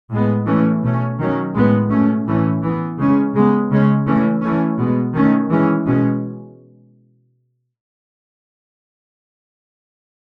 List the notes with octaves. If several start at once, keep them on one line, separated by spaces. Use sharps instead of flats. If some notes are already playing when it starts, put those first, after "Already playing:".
A2 G#3 B3
E3 A3 C#4
B2 A3 C#4
D#3 F#3 C#4
A2 G#3 B3
B2 A3 C#4
A2 E3 A3 C#4
E3 B3
C#3 G#3 C#4
C#3 G#3 B3
C#3 G#3 C#4
E3 A3 C#4
E3 A3 C#4
B2 G#3 B3
D#3 A3 C#4
E3 G#3 C#4
B2 G#3 C#4